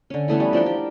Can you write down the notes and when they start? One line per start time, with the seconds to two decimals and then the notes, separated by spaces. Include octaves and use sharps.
0.10 D3 C#4
0.28 E3 A3 B3 C#4
0.40 G3
0.53 F3 D4 A#4 G5
0.66 G4